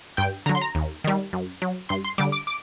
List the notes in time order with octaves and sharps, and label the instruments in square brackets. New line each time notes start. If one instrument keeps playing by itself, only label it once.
[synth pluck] G2 G5
D3 F#3 A#5
C6
A#5
D#2
D#3 G3
F#2
F#3
G2 C6
C6
D3 G3 D6
D6
D6